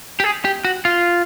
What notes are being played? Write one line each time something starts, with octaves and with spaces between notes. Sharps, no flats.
G4
G#4
G4
F#4
F4